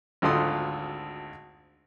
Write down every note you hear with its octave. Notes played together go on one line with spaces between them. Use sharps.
G#1 D2 F4 A4 C6 D#6